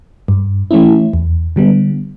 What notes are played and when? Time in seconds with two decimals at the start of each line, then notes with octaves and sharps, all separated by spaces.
0.28 G2
0.71 E3 A3 C#4 E4
1.13 E2
1.56 D3 G3 B3